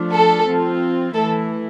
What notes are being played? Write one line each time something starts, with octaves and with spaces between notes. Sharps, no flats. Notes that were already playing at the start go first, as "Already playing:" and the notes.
Already playing: F3 A3 D4 F4
A4
F3 C4 F4
E3 A3 E4 A4